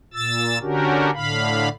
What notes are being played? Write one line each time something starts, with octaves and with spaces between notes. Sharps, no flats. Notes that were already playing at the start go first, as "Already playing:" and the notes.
A#2 E6 A6
D3 C#4 D4 F#4 G4 A#4
A2 D3 F5 B5